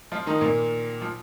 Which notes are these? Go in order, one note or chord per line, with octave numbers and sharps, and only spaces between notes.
F3 F4
D#3 D#4
A#2 A#3
F3